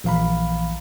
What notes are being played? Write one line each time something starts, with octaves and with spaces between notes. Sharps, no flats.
A#1 E3 F5 A#5 B5